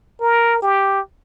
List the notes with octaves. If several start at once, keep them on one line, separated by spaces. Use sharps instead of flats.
A#4
G4